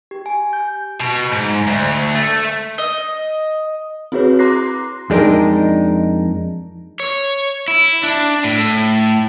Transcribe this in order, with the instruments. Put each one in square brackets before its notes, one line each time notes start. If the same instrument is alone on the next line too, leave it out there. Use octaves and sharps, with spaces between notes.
[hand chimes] G4
G#5
G6
[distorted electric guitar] B2
G#2
D2
A3
[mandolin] D#5
[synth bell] C4 E4 F#4 G#4 B4 C#5
A#5 C6 D6 F#6 A#6 C7
[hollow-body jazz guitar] F2 G#3 D4 D#4 A#4
[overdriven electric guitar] C#5
E4
D4
A2